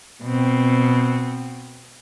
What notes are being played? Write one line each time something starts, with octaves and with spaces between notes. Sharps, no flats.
B2 C4